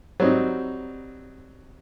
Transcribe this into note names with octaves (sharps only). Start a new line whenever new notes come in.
F#3 G3 C4 D#4